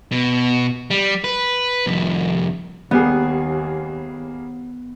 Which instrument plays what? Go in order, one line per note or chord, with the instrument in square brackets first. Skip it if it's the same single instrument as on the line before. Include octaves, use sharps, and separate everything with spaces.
[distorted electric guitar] B2
G3
B4
C2 F2
[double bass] D#2 [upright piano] G3 A#3 G#4 [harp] B3